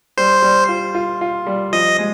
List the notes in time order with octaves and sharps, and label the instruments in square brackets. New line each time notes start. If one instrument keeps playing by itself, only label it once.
[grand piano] G3 [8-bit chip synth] C5
[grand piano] G3
F4
F4
F4
G3
[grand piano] F3 [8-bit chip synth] D#5
[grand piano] G#3